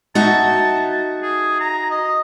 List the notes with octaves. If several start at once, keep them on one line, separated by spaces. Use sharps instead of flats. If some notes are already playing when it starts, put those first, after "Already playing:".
D#4 F#4 E5 A5
G#4
A#5
D#5